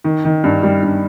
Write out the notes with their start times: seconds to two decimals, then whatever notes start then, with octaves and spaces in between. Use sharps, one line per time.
0.04 D#3
0.25 D#3
0.44 G2
0.63 G3
0.83 G2